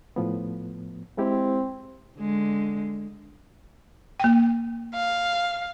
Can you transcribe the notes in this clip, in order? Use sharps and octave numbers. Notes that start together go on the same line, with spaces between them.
A2 F3 B3
G#3 C4 E4 G4
D3 G#3
A#3 G5
F5